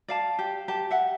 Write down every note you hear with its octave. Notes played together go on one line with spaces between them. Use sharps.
D5 F5 A5
G4
G4 A5
E5 F#5